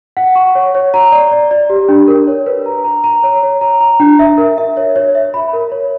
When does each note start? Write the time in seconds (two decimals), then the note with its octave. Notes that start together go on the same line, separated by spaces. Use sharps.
0.17 F#5
0.35 C#6
0.55 C#5
0.75 C#5
0.94 A#5
1.12 D5
1.31 D5
1.51 D5
1.70 G4
1.89 D4
2.08 A#4
2.28 C#5
2.47 B4
2.66 A#5
2.84 A#5
3.04 A#5
3.24 C#5
3.43 C#5
3.61 A#5
3.81 A#5
4.00 D4
4.19 E5
4.38 A#4
4.58 E5
4.77 C#5
4.96 C#5
5.15 E5
5.34 B5
5.53 A#4
5.72 C#5